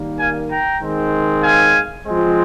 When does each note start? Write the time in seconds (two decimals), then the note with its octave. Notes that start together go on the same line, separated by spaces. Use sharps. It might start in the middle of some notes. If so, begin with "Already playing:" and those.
Already playing: D#3 G3 A#3
0.19 F5 G#5
0.51 G5 A#5
0.81 D#3 G#3 C4
1.43 F5 G#5
2.05 F3 G#3 C4